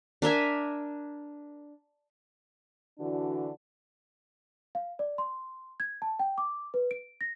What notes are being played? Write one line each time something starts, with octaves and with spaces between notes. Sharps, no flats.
D4 A#4 E5 G#5
D3 E3 D4 F#4
F5
D5
C6
G#6
A5
G5
D6
B4
D7
A#6